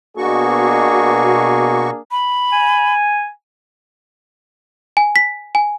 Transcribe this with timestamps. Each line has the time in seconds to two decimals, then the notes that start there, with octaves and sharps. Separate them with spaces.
0.17 B2 A#3 D4 F#4 G#4 C#6
2.11 B5
2.52 G#5
4.97 G#5
5.16 B6
5.55 G#5